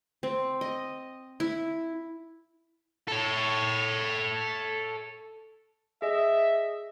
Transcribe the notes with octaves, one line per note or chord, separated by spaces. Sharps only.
C4
D#5
E4
A4 C#5
G#4 D#5 E5